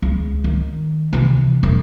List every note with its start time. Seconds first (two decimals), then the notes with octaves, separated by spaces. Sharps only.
0.02 C#2
0.44 D#3
1.13 C3 E3
1.63 E1